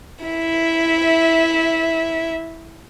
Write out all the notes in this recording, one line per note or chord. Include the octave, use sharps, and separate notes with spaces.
E4 E5